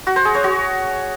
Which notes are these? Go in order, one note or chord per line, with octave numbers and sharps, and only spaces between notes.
F#4
C5
G#4
C#5
F#4